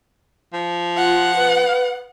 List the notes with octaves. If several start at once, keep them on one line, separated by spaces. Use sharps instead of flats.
F3
F4 F#5
B4